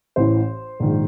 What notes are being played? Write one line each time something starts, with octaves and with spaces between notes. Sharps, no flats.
A1 A2 E3 C5
A#1 G#2 D#3